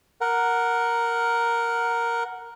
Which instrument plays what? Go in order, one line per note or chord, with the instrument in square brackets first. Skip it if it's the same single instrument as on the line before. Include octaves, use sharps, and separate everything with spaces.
[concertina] A#4 F#5